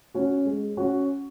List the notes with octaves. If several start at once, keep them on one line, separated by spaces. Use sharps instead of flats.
C#4 F#4
G#3
C#4 F#4